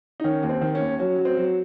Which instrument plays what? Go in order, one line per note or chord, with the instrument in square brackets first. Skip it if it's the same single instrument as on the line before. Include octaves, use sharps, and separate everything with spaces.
[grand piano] D#4
D#3 C#4
D#2
C4
D#3
C#4
D#2
F#3 C#4
F#3
C4
F#3